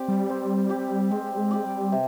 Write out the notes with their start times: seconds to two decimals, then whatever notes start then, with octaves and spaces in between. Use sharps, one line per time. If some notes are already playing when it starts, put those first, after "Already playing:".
Already playing: C4 G4 D5
0.08 G3
0.29 C4
0.69 G4 D5
1.11 G#3 C4
1.34 G3
1.38 G#3
1.51 G4 D5
1.65 G3
1.92 C3